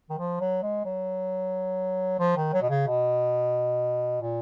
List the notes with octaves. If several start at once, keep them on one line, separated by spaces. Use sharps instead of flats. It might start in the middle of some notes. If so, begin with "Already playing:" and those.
D#3
F3
F#3
G#3
F#3
F3
D#3
F#3
B2
C#3
B2
A#2